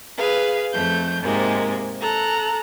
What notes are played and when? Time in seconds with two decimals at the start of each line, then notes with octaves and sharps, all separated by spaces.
0.17 G#4 B4 F5
0.73 F2 A3 G6
1.23 G#2 C3 G#3 A#3
2.00 A4 A#5 F#6